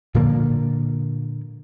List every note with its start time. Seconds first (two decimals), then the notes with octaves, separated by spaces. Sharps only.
0.15 A#2 D3 F3 A#3